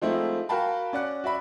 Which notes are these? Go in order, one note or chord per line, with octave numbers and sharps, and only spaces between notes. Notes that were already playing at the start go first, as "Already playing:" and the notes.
F3 G#3 A3 C4 D#4 E4
F#4 A#4 F5 G5 A5 B5
C#4 D5 F#5 F#6
F#4 D5 E5 B5